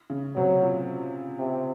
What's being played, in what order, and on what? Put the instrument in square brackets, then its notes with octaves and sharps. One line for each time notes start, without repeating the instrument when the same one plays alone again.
[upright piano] C#3
[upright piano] C3 [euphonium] F#3
[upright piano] A#2
[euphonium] C3